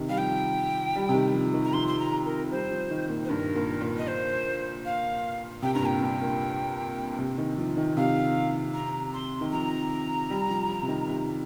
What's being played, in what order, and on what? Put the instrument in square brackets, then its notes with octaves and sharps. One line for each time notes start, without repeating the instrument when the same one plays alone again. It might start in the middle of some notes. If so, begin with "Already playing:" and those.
Already playing: [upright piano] C3 D#3
[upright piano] G3 [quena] F5
[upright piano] F3 [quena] G5
[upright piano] G3
C3
D#3
F3
D#3
[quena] A#5
[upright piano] F3 [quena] C6
[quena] C6
A#5
A#4
[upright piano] G3 [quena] C5
[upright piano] F3
D#3
A#2
[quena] C5
[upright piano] G2 [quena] A#4
[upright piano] A#2
A#2
[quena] D#5
C5
F5
[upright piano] C3 [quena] G5
[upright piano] G2 [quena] A#5
[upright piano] A#2 [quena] G5
[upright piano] G2
A#2
C3
D#3
F3
D#3
[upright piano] C3 [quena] F5
[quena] A#5
C6
[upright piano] D#3
[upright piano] F3 [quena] A#5
[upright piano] G3
F3
F3
C3
D#3
C3